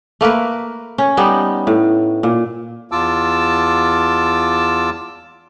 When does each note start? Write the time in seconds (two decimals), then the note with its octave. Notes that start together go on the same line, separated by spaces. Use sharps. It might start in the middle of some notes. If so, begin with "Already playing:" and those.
0.21 A3 A#3 A#4 B4
0.98 C#4
1.17 G3 B3 D#4
1.67 A2
2.23 A#2
2.92 E2 F4 A5 D6 E6